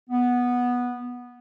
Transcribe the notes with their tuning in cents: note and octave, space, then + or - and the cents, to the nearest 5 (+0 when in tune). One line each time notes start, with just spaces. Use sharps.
B3 -10